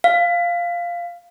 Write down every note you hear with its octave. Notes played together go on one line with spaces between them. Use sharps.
F5